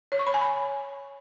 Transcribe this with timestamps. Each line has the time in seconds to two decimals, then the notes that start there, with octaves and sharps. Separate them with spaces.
0.12 C#5
0.19 C#6
0.27 B5
0.34 G#5
0.41 B5